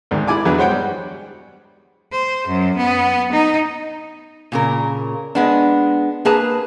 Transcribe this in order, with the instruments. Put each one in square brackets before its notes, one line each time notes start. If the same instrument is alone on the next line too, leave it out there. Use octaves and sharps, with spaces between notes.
[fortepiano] D2 G#2 D#3
E4 D5 G#5 D6
E2 D3 F#3 G#4 B4
G#3 F#4 C5 C#5 F#5 G5
G3
[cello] C5
F#2
B3
D#4
[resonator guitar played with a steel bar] A#2 C#3 A#4
G#3 B3 D4
A#3 G#4 B4 A5